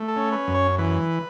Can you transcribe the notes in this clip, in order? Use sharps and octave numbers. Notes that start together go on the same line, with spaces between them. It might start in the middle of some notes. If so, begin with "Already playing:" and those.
Already playing: A3
A4
C#4
B4
F#2
C#5
E3 B4